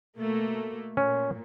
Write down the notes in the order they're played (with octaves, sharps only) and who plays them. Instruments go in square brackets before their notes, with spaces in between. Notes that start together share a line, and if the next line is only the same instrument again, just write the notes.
[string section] B2 A3 A#3
[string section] A#2 [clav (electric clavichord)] C#4